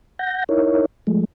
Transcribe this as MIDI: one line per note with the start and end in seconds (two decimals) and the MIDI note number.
0.19 0.44 78
0.19 0.44 91
0.19 0.44 94
0.49 0.85 63
0.49 0.85 64
0.49 0.85 70
0.49 0.85 73
1.07 1.25 53
1.07 1.25 56
1.07 1.25 57